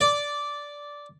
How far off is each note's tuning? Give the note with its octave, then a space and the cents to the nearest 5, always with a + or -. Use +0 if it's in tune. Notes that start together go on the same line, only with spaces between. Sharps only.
D5 -10